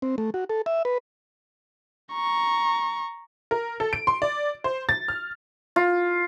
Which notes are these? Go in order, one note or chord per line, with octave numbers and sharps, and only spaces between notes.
C4
A3
F#4
A4
E5
B4
A#5 C#6
A#4
A4
D7
C6
D5
C5
A6
F6
F4